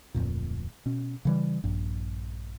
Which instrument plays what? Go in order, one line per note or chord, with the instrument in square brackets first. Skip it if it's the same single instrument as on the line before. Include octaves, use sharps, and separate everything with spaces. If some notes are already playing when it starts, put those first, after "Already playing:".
[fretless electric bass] D1 G1 F2 A#2
B2 C#4
C#3 E3 G3
A#1 G2